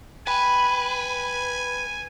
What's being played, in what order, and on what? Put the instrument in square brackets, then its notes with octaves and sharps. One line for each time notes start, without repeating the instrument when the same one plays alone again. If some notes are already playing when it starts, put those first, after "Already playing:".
[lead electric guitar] B4 [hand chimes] G5 B5 [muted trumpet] G#5